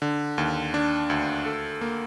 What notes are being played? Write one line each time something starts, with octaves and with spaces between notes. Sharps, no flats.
D3
D#2
D4
D2
A4
A#3